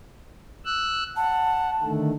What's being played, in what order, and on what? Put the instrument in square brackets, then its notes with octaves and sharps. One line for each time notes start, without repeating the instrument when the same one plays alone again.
[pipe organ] E6 F#6
[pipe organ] F#5 [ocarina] A5
[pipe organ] D3 D#3 A3